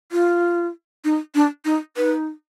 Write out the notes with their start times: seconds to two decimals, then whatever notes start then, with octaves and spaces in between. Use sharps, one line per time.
0.12 F4
1.05 D#4
1.35 D4
1.65 D#4
1.97 D#4 B4